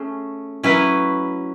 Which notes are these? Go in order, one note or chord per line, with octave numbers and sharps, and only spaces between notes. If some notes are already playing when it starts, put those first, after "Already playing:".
Already playing: A3 C#4 G#4
F#3 C#4 E4 B4